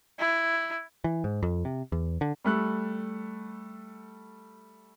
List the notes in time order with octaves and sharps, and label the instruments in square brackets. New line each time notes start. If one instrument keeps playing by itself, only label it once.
[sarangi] E4
[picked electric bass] E3
G#2
F2
C3
E2
D3
[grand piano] G3 A3 F#6